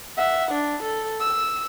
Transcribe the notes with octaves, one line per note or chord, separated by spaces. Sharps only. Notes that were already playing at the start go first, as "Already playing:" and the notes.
E5 F#5
D4
A4
E6